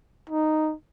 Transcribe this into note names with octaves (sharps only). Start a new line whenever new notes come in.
D#4